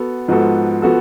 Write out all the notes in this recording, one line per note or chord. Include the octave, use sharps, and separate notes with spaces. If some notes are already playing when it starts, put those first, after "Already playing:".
Already playing: B3 F#4 A4
G#2 F3 B3 F#4 A4
F3 B3 F#4 A4